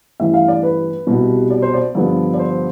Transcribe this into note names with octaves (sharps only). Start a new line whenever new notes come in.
A1 G2 E3 E5
F5
D5
B4
C2 B2 G3
D5
C5
D5
G2 D3 F3 B3
D5
C5